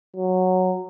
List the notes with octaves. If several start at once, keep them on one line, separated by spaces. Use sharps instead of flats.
F#3